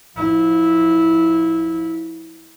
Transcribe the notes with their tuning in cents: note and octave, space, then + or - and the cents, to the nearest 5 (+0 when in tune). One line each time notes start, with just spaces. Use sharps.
F3 +15 E4 -15